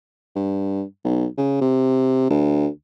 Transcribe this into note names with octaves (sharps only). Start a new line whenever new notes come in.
G2
B1
C#3
C3
D2